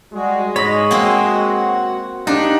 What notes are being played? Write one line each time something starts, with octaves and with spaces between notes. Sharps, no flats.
G3 G#3 F#4 G#4
G#2 C#5 D#5 B5
A#3 C4 F#4 F#5
D4 D#4 G4 F5 F#5